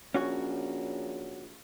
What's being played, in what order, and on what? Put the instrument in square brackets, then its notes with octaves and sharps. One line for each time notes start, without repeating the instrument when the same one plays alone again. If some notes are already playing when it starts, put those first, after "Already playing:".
[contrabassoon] A#1 [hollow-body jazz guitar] C#4 F#4 C#5